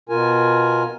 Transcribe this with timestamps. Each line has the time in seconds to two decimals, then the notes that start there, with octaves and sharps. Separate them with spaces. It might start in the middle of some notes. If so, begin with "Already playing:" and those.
0.09 B2 F4 A#4 G#5